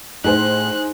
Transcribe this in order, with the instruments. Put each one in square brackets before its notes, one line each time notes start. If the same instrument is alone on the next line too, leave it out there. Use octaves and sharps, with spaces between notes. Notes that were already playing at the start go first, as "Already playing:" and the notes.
[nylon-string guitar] A2 [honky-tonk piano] D#4 G#4 C5 [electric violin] F#6